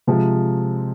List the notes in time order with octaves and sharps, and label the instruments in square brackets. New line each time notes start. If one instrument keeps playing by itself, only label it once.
[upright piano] C3 F3 G#3